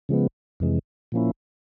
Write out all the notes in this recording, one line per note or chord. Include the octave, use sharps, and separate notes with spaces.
C#3 F3 G#3 B3
F2 C3 E3 G#3
A#2 F3 A#3 C#4 E4